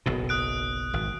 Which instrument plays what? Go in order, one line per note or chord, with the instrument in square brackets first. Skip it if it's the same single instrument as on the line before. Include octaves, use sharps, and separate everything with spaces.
[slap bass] F#1 B1 B2
[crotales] D#6 F#6 D7
[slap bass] G#1